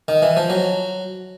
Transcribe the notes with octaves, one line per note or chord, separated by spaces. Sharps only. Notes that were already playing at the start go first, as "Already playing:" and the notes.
D#3
E3
F3
F#3